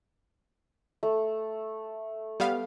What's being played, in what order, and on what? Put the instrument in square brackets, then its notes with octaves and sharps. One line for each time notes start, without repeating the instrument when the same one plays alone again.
[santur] A3
[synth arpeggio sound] G3 B3 F5